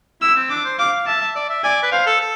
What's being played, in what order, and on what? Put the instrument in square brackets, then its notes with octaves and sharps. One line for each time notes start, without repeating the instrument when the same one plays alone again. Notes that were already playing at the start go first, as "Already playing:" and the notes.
[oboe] E4 [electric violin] E6
[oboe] C4
[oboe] D4 [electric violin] D6
[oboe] C5
[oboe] F5 [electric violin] D6
[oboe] E5 [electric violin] A5
[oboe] E5
D5
E5
[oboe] D5 [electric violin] G#5
[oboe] B4
[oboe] C5 [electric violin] F5
[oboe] A4
A4